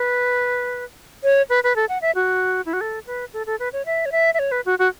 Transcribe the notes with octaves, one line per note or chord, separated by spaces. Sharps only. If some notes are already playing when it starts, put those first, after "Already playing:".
Already playing: B4
C#5
B4
B4
A4
F#5
E5
F#4
E4
F#4
A4
B4
A4
A4
B4
C#5
E5
C#5
E5
E5
C#5
B4
F#4
F#4